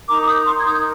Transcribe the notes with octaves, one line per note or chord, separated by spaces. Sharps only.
D#4 A#4 A#5 D6
D#6 G6
C6 D#6
G#6
D#4 A#4 D#6 G6